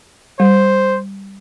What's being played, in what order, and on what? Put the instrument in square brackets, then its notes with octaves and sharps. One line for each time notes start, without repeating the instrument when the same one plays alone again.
[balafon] G3 [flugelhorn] C5